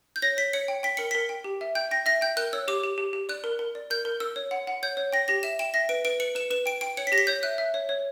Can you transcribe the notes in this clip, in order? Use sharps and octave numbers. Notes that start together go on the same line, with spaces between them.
G6
C#5 A#6
C#5 B6
C#5 C#7
G5
G5 B6
A#4 C#7
A#4 B6
G5
G4
E5
G5 G6
G5 A#6
E5 A#6
G5 G6
A#4 F#6
C#5 E6
G4 D6
G4
G4
G4
D5 F#6
A#4
A#4
D5
A#4 G6
A#4
A#4 E6
C#5
F#5
F#5
C#5 G6
C#5
G5 A#6
G4 A#6
E5 E7
G5 E7
E5 A#6
B4 D7
B4 D7
B4 C#7
B4 E7
B4 E7
G5 D7
G5 D7
C#5 C#7
B6
G4 A#6
B6
C#5 G6
E5 F#6
E5
C#5
C#5